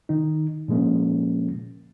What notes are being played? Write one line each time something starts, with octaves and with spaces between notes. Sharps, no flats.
D#3 D#4
A#2 F3 G#3 A#3 C#4